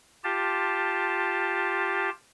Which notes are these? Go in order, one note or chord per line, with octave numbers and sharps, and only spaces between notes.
F4 G4 A5